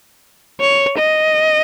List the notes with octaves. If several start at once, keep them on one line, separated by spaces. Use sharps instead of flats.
C#5
D#5